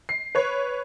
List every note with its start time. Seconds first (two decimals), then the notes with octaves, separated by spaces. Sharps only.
0.09 C7
0.35 B4 C#5